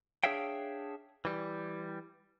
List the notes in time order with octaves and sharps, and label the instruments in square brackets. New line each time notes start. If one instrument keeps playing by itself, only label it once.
[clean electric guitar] D4 G#4 C#5 E5 F5 G5
E3 G3